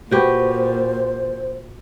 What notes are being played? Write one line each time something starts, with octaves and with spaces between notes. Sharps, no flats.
A#2 F#4 G4 B4 C5